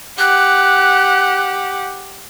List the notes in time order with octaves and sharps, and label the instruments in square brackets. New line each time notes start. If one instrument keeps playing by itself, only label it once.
[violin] G4 F#5 [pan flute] F#6